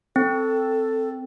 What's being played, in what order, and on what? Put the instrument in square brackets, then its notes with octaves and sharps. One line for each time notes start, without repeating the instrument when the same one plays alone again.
[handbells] C4 [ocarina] A4